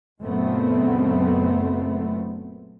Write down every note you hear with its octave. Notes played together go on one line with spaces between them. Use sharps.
F#1 F#2 A#2 A3 B3 C4